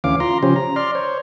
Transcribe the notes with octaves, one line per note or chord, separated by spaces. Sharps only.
D2 E3 C#4 F5 D6
F4 A#5 C6
C#3 F3 C#4 G4 C5
A#5
D5 C6 F6
C5 C#5